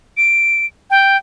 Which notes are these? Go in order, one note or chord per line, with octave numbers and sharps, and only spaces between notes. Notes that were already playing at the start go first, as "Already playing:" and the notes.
D7
G5